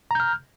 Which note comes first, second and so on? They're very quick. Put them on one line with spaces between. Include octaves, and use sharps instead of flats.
A#5 G6 F6